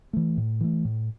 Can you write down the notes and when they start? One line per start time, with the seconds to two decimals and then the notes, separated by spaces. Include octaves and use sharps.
0.13 E3 A3
0.37 A2
0.60 E3 A3
0.85 A2